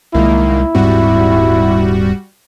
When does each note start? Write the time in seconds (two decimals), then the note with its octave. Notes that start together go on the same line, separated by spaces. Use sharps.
0.15 C2 A#2 D#3 G#3 A#3 E4
0.75 D#1 G#2 G3 C4 F#4